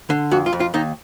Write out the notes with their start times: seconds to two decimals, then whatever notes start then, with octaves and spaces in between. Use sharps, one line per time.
0.10 D3
0.31 F2 F#4
0.46 F4
0.53 F2
0.60 F4
0.74 D#2 D#4